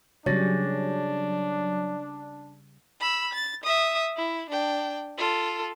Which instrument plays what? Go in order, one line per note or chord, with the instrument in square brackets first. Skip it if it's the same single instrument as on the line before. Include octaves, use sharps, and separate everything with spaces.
[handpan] C#3 G3 C#4 [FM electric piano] F#3 [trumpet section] D4 [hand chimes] C#5 A6 A#6
[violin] B5 E6
A6
E5 D#6
E4
D4 G5
F4 A4